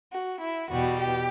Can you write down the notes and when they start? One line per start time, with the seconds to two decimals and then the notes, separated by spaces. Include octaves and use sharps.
0.11 F#4
0.40 E4
0.69 E2 B2 G3 F#4
0.99 G4